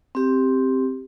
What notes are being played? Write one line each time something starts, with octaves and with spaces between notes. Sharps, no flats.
C4 G4